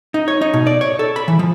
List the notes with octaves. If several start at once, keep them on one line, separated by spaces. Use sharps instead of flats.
D#4
C#5
D#4
B2
D5
C#5
A4
B5
E3
F3